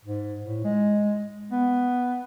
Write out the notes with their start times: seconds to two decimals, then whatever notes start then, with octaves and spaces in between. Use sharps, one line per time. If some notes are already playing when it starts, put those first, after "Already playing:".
0.05 G#2
0.44 A2
0.64 G#3
1.52 B3